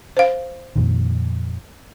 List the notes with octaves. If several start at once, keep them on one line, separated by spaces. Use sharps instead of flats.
C5 F5
F2 A#2 D#3